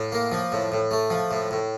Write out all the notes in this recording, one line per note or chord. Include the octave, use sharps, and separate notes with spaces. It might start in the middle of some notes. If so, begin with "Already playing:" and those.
Already playing: A2 F5
A#3
F3
A2
A2
A3
F3
A2
A2